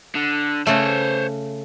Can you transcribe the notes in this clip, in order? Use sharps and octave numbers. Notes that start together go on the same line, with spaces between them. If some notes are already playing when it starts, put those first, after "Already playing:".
D3
C#3 A3 C5 C#5